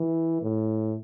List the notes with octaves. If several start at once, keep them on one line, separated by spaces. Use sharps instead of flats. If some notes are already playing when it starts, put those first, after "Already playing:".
Already playing: E3
A2